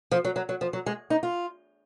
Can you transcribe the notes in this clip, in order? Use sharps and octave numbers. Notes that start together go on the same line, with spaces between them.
F3
F#3
F#3
F#3
F3
F#3
G#3
D#4
F4